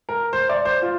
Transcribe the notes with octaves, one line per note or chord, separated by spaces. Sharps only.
A#4
C5
D5
C5
F4